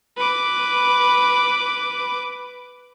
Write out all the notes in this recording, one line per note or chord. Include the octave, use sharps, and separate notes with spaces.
B4 D6